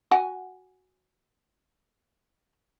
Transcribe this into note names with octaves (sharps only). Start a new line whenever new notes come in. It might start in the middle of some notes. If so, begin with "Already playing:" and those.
F#4 F#5 G#5